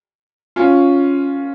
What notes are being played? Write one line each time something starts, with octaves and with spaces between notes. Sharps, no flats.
C#4 F4